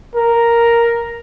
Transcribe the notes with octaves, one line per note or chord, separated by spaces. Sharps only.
A#4